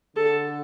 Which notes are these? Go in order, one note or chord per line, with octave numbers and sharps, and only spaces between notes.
D3 A4